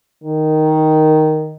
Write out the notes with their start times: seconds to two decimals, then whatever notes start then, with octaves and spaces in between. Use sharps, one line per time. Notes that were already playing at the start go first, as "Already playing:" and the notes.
0.24 D#3